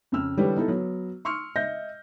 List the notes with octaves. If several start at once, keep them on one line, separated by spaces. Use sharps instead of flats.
F2 C#3 C4 E6 F6
D3 E3 G3 G4 B4 C#5
B3 D#4 E4 A4
F#3 B3
C6 C#6 E6 F6 C#7
D#5 E5 G6 A#6